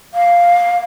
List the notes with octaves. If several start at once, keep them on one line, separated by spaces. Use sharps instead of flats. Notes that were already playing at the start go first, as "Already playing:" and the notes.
F5